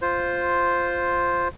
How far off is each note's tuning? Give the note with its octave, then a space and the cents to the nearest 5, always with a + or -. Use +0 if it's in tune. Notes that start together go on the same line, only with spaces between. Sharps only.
F4 +0 C5 +0